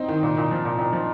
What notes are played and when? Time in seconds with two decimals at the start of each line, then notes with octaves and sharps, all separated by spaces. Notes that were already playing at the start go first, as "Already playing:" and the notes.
Already playing: C4 D#4
0.08 D#3
0.23 A#2
0.37 A#2
0.51 F3
0.65 A#2
0.79 A#2
0.93 F3